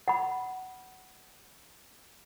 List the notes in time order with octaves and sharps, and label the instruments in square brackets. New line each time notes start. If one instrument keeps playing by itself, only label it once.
[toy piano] F#5 B5